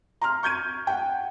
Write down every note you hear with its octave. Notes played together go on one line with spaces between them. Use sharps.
A#5 C6 F6
C#6 G6 G#6 D#7
F#5 G5